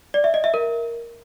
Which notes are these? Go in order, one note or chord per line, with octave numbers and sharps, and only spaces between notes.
D5
E5
D#5
E5
A#4